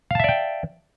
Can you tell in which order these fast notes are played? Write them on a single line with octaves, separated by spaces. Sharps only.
F5 A5 E5 D5 G5